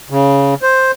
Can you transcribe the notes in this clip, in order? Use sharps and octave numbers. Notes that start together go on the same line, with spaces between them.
C#3
C5